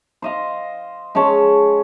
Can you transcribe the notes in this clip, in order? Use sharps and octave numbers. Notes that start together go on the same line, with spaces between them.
C5 D#5 F5
G#3 C#4 C#5 A5